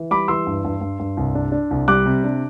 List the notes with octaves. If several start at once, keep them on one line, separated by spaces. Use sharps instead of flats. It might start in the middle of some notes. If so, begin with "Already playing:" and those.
Already playing: E3
G3 B5 D6
E3 C6 E6
G2
G2
G2
G2
C2
D4
D4
C2
G3 D6 F#6
C3
D4